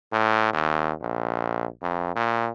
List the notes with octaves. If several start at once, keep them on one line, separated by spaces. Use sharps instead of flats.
A2
D#2
A#1
F2
A#2